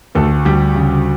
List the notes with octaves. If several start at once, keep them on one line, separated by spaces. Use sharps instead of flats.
D2 A3 A4
D2 G3 G4
C#3